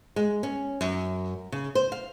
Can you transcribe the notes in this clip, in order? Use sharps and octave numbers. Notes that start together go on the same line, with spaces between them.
G#3
C#4
F#2
C#3
C5
F5